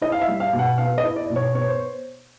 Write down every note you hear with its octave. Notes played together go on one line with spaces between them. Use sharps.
E4 D#5
F5
E5
G3
F5
B2
F#5
B3 F5
D#5
E4
D5
B2
C#5
B3 C#5
C5